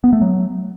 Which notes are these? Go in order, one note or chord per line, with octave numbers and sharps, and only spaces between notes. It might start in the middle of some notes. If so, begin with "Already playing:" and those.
B3
A3
F#3